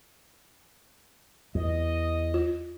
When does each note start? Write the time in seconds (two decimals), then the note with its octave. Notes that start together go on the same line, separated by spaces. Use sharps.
1.55 E2 D#5
2.34 F4